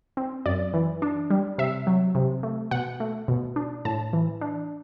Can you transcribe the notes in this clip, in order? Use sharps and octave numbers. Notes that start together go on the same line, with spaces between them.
C4
F#2 D5
E3
D4
G3
C3 E5
F#3
C3
A3
B2 F#5
A3
B2
D4
A2 A5
E3
D4